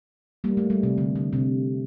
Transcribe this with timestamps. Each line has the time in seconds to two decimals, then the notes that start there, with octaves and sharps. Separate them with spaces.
0.44 G3 A#3
0.57 A3
0.70 G3
0.83 C3
0.98 D3
1.16 D3
1.33 C3